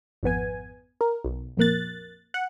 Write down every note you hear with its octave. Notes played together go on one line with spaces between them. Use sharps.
G#1 F2 B3 G#5
A#4
B1
A#1 F2 A#3 F#6 A6
F#5